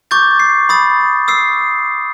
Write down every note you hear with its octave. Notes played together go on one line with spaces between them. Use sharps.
C#6 D6 G6 A6
C7
B5 D#6 A6
D#6 E6 C7